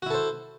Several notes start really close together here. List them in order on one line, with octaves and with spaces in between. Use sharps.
F#4 E4 A4 C5